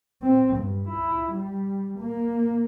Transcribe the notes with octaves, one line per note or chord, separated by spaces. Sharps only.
C4
G2
E4
G3
A#3